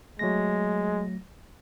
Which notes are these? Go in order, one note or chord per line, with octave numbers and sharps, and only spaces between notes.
F#3 G#3 A3 A#6